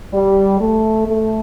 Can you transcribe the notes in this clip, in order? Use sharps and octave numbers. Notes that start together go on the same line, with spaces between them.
G3
A3
A3